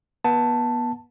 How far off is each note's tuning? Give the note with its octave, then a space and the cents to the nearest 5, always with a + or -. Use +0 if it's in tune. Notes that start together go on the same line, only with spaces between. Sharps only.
B3 -30 A5 +5